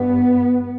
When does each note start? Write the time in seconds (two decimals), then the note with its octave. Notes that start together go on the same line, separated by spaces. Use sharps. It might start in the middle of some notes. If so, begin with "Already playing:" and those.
Already playing: G2 B3